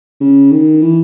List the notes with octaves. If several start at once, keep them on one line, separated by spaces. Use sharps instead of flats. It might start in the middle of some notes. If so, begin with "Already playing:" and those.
C#3
D#3
E3